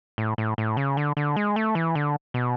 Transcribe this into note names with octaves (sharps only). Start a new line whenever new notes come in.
A2
A2
A2
C#3
D3
D3
G#3
A3
E3
D3
B2